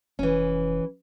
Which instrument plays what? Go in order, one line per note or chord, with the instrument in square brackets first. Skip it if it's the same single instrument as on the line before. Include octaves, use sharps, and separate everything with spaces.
[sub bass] F1 [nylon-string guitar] E3 C#4